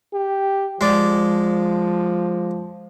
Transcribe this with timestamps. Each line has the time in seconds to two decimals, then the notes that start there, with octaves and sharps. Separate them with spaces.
0.14 G4
0.81 F3 G#3 D5